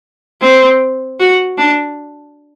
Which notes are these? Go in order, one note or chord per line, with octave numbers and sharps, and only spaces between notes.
C4
F#4
D4